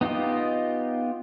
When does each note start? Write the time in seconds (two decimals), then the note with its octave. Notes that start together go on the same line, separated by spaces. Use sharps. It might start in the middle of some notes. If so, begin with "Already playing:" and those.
0.01 B3 D#4 F4 G4 D#5